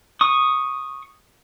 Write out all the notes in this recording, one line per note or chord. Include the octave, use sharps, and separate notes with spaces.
C#6 D#6